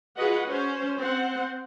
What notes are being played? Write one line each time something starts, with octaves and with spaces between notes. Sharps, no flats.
F4 F#4 G#4 B4 D#5 F#5
C#4 C5
C4 C5 F#5